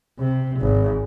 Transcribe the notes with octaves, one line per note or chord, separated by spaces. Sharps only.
C3
G#1